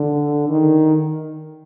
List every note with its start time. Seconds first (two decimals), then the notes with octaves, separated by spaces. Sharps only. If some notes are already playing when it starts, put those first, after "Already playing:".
Already playing: D3
0.49 D#3